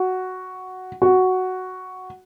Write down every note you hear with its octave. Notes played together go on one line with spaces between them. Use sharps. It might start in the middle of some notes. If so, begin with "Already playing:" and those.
Already playing: F#4
F#4